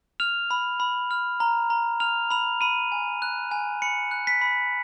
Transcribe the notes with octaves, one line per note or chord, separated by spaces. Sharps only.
F6 F7
B5
B5
F6
A#5
A#5
F6 F7
B5 F7
B5 D#7
G#5
F#6
G#5
B5 C#7
F#6
B6
B5